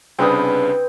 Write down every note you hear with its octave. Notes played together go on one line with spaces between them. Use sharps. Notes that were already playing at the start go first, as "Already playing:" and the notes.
C2 C#3 C4 D4 B4 D#6